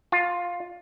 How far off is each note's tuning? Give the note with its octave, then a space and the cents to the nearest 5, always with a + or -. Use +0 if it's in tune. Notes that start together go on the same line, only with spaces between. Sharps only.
F4 +10